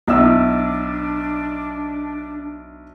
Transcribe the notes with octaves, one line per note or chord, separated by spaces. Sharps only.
B1 D4 E4 E6